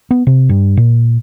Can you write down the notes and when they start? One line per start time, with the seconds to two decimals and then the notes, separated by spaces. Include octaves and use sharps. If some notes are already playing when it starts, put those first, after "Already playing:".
0.11 B3
0.27 C3
0.49 G2
0.77 A#2